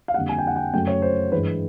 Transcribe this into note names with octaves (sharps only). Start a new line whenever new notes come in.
F5
F2 D3 G3 A#3 F#5
G#5
G5
F#5
G5
F#2 C#3 F#3 A3 G5
C#5
C5
G2 E3 G#3 B4